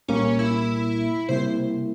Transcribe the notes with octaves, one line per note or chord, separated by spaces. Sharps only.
C2 A#2 G3 A#3 C#4
E4
C3 G3 A#3 E4 C5